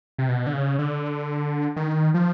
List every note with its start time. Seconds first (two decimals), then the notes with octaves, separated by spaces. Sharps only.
0.18 C3
0.29 B2
0.47 D3
0.53 C#3
0.79 D3
1.76 D#3
2.14 F3